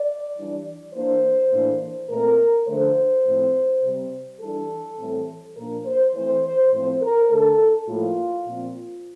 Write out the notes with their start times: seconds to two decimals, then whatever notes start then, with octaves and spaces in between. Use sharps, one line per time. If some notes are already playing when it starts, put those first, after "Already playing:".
Already playing: D5
0.37 E3 G3 D4
0.94 E3 A#3 D4 C5
1.52 A2 E3 A#3 D4
2.10 A#2 A3 C4 A#4
2.67 D3 F3 A3 D4 C5
3.26 A2 F3 C4
3.83 C3 G3 C4
4.41 E3 G3 D4 A4
4.99 A2 E3 G3 C4
5.57 A#2 F3 A#3 D4 A#4
5.86 C5
6.15 E3 A3 C4 C5
6.43 C5
6.72 A2 F3 C4 C5
7.01 A#4
7.30 D3 A3 D4 A4
7.88 A2 F3 A#3 F4
8.46 A#2 F3 C4